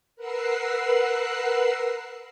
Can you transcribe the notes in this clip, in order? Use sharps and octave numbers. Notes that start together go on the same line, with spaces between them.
A#4 B4 F#5 E6 F#6 C7